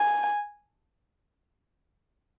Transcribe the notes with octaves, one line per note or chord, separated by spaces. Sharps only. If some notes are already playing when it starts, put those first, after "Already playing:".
Already playing: G#5